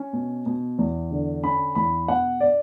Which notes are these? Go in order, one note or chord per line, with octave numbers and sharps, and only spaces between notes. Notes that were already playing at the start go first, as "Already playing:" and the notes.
Already playing: C#4
B2
B2
E2
D3
C#4 B5
E2 B5
B2 F#5
D5